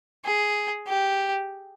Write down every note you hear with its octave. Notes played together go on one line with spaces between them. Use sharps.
G#4
G4